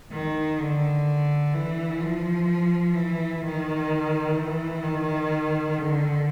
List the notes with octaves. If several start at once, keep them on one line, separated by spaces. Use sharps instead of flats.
D#3
D3
E3
F3
E3
D#3
E3
D#3
D3